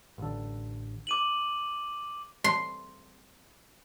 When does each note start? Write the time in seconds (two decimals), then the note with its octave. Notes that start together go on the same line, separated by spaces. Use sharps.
0.18 A1 D3
1.07 D6 D#7 F#7
2.44 C6